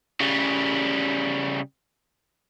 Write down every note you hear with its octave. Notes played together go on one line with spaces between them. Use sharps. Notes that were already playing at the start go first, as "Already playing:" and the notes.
C#3 G3